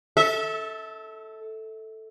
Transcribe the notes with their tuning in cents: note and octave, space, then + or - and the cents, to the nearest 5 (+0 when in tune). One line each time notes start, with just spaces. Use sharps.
A4 +0 E5 -30